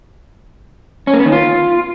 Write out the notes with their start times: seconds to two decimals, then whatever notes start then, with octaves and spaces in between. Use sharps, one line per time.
1.07 C#4
1.13 A#3
1.20 B3
1.26 D#3
1.32 F4